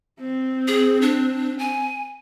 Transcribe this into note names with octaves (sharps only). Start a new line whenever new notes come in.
C4
G#4
D4
G#5